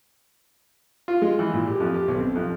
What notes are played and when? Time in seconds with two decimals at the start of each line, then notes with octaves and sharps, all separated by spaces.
1.08 F4
1.22 G#3
1.39 E3
1.53 A#2
1.67 G4
1.80 F2
1.94 G4
2.08 B1
2.20 C4
2.35 F2